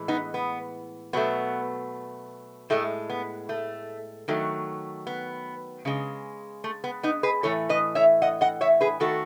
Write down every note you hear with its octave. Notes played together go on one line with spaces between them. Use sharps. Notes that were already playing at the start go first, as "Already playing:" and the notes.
Already playing: A2 E3 G#3
B3 D#4
B3
B2 F#3 A3 B3
A2 G#3 A3
B3
A3
D#3 F#3 A3
B3
C#3 G#3
A3
B3
B3 D#4
G#4 B4
A2 E3 A3 A4 C#5
B4 D#5
C#5 E5
D#5 F#5
D#5 F#5
C#5 E5
G#4 B4
D#3 A3 F#4 A4